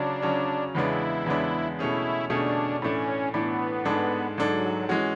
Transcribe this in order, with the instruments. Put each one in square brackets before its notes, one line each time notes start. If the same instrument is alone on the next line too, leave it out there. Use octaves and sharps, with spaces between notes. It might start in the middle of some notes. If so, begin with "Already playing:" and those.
Already playing: [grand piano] C#3 F#3 C#4 [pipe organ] D4
[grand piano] C#3 F#3 C#4
[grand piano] E2 C#3 G#3 B3 D4 [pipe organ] E4
[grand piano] E2 C#3 G#3 B3 D4
[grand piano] B2 A3 C#4 G#4 [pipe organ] E4
[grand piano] B2 A3 C#4 G#4 [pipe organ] D4
[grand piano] A2 E3 A3 D4 [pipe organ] C#4
[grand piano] A2 E3 A3 D4 [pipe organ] B3
[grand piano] G#2 G#3 D4 A4
[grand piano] G#2 G#3 D4 A4 [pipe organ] F#3
[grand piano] E3 G#3 C#4 F#4